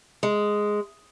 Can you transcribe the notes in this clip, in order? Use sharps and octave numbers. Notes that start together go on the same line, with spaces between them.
G#3